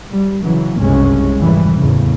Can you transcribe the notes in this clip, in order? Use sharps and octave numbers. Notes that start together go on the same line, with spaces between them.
G3
C#3 E3 F#3
F#1 C2 G2 G#3 C#4
F2 G#2 C#3 E3 G3
E2 A2 C#3